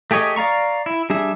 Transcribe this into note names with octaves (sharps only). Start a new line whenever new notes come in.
A3 G4 G#4 C#5 D#5
D5 F5 A#5 C#6
E4
G3 D4 G#4 E5